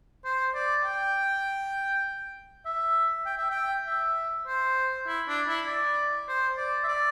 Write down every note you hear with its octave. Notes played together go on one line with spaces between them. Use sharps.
C5
D5
G5
E5
G5
E5
G5
E5
C5
E4
D4
E4
D5
C5
D5
E5
D5